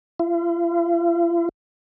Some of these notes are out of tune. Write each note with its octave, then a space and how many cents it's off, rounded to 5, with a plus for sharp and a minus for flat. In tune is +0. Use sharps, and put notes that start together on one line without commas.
F4 -45